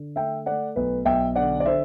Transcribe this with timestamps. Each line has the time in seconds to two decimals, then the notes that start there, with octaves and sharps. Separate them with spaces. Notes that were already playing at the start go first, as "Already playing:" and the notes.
Already playing: D3
0.16 A3 E5 G5
0.46 A3 D5 F#5
0.76 B1 B4
1.05 B1 E5 G5
1.36 D3 D5 F#5
1.60 D5
1.65 D3 C5 E5